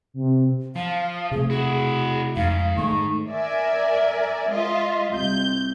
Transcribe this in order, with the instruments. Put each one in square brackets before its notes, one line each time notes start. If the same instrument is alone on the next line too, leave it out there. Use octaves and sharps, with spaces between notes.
[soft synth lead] C3
[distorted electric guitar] F3 [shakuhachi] F5
[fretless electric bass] C3 A3 [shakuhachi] G#4
[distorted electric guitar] E4 F#4 [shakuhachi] G#4
[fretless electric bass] F2 [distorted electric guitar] G#2 [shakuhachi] F5
[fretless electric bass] D#3 A3 [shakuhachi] C#6
[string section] A#4 D5 E5 G#5
G#3 F4 D#5 E5
C2 G6